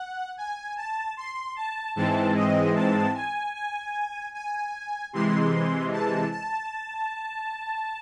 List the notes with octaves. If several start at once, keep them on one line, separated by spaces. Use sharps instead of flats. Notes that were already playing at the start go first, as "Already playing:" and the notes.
Already playing: F#5
G#5
A5
C6
A5
G#2 E3 G#3 C4 A5
D#5
A5
G#5
G#5
G#5
C3 E3 G#3 C6
A5
A5